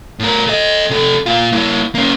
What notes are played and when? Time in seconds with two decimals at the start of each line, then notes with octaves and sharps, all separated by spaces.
0.19 A2 A#4
0.47 A4 D#5
0.90 C3 A4
1.26 A#2 F4
1.52 A#3 E4
1.95 A#3 C#4